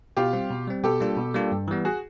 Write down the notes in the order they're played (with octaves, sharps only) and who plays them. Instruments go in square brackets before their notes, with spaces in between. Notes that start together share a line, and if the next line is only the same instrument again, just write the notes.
[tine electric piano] B2 [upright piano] F4 G4
[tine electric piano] G3 C4
B2
G3 C4
[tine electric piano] B2 [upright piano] G4 A4
[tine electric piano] G3 A#3 D4 F4
B2
G3 A#3 D4 F4
G2
E3 G3 B3
[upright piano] F#4 G#4